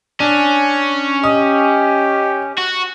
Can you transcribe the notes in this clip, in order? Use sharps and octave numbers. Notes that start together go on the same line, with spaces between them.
C#4 D4
G4 D#5 D#6
F#4